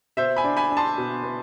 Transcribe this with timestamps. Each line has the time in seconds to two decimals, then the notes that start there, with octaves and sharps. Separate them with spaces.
0.17 B2 C5 E5
0.37 G#5 B5
0.44 D4
0.57 G#5 B5
0.70 D4
0.77 A5 C6
0.98 B2
1.23 B3